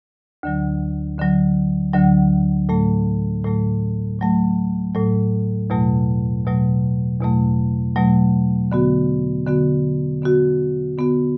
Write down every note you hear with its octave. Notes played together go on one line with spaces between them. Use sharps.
D2 D3 F#3
D2 D3 F#3
D2 D3 F#3
A2 F#3 A3
A2 F#3 A3
A2 F#3 A3
A2 F#3 A3
E2 B2 F#3 A3
E2 B2 F#3 A3
E2 B2 F#3 A3
E2 B2 F#3 A3
D3 B3 F#4
D3 B3 F#4
D3 B3 F#4
D3 B3 F#4